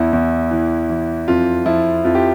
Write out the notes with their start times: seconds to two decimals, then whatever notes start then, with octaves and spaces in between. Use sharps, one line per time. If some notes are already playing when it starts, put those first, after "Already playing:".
Already playing: E2 E4
0.13 E2
0.51 E3
0.89 E3
1.27 F2 F4
1.65 F3 E4
2.04 F2 F4
2.15 G4